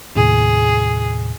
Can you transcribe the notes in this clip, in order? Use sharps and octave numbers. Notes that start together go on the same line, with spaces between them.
D#2 A2 C3 G#4